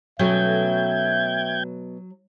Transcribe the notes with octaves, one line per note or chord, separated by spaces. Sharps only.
B2 F#3 A3 C#4 E5 G5 G6 G#6